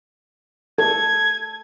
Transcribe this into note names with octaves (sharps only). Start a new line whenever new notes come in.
A4 G#6